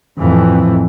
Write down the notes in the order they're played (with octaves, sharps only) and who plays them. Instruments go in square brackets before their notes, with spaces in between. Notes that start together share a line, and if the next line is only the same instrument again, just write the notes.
[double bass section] F2 A2 E3